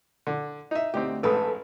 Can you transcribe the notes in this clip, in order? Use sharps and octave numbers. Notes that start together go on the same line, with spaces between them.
D3
D#4 E5
D2 C4 D#4 G4
A1 G#2 A4 B4 D#6